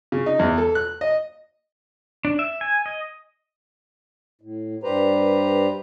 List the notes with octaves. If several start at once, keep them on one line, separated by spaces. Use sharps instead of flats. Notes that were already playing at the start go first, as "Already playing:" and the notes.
C#3
D#4
E2
A4
F#6
D#5
D4
E5
G#5
D#5
A2
G2 G3 G4 B4 C5 A#5